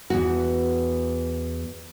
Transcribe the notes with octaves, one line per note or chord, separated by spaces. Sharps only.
E2 F#4